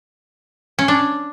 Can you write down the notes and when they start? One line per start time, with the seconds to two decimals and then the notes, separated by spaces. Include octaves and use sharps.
0.79 C#4
0.88 D4